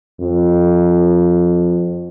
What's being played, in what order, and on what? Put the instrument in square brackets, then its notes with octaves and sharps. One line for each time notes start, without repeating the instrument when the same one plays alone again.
[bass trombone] F2